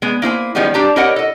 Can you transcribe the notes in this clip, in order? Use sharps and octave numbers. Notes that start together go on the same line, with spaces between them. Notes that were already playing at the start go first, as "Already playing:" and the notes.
G#3 B3
A#3 E4 C5 G#5
D#3 F3 G3 G#3 B3 C#4
G3 D4 G4 A5 A#5
E4 G4 A#4 C#5 D#5 F#5
A4 D#5